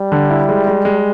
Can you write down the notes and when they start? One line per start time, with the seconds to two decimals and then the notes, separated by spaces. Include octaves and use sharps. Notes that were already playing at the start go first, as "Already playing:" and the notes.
Already playing: G3
0.12 D3
0.30 E4
0.49 G#3
0.67 G#3
0.85 G#3